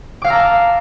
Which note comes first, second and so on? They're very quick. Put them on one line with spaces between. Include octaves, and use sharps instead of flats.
D6 F5 E6 A#5 A5